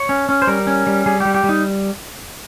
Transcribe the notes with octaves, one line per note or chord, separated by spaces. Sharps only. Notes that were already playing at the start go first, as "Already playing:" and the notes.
Already playing: C#5
C#4
C#4
C5
G3 A#4
C#4
G3
G3 G#4
G3 G4
G4
G3
D#4